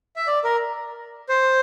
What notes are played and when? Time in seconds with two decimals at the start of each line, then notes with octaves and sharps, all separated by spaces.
0.16 E5
0.27 D5
0.44 A#4
1.29 C5